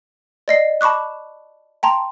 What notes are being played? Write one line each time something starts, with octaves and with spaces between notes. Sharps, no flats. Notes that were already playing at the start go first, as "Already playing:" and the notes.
D5 D#5 C7
A5 B5 C#6 D6 F#6
G5 A5 A#5 C6